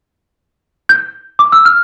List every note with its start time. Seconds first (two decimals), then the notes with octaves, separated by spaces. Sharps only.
0.89 G6
1.39 D6
1.52 E6
1.65 F6